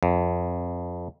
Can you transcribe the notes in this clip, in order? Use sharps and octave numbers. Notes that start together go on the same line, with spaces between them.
F2